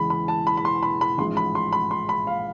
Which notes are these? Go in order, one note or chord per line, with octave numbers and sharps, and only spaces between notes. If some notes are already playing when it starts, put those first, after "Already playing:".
Already playing: E2 C#3 E3 G#3 B5
B5
A5
B5
B5
C6
B5
B5
A1 G#2 F3 G#3 C6
B5
C6
B5
C6
B5
F5